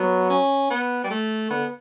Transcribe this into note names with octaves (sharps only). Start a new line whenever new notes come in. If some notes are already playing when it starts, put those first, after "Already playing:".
Already playing: F#3 B3
C#4
B3
G3
A3
D3 B3